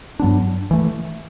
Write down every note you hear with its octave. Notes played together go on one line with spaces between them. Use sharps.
G2 F#3 B3 D4
E3 A3